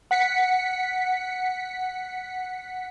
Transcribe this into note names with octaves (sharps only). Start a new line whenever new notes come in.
F#5 B6 C#7